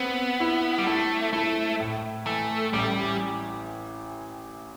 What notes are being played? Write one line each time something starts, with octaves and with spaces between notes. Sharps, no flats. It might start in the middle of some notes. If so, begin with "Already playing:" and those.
Already playing: B3 C4
E4
G3
A3 E4
A3 E4
A2
E3 A3
A1 G3